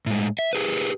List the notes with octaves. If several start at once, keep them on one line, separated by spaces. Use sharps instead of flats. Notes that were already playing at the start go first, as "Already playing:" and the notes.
A2 G#3
E5
G4 G#4 B4